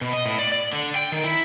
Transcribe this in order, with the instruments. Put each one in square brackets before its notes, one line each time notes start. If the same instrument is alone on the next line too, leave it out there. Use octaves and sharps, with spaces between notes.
[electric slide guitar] B2
D#5
A2
D5
D5
D3
G5
D#3
E4